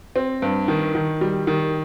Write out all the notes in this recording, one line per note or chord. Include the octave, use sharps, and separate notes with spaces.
C4
G2
D#3
D#3
G3
D#3